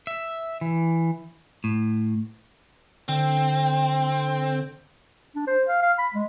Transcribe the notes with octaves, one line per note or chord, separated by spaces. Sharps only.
E5
E3
A2
D3 C4
D4
C5
F5
F5
B5
G#3